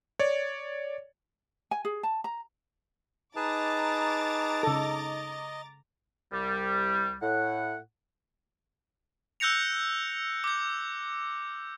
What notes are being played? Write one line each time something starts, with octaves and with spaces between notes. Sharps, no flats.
C#5 D5
G#5
G#4
A5
A#5
D#4 G#4 B4 A5 A#5 D6 A6
C#3 A4 D#5
C2 G3
A2 F#5
E6 F#6 G6 A#6 C#7 F7
D6 G6